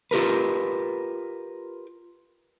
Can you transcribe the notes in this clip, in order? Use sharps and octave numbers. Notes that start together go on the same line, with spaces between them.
F4 G4 A#4 B4